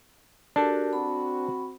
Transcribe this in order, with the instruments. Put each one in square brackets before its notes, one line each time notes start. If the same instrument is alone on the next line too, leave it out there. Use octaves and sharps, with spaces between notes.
[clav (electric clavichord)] D4 A4 [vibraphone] F#4 G4 A#4
[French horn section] C4 F#4 [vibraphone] B5